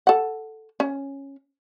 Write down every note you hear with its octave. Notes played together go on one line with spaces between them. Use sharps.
A4 F#5
C#4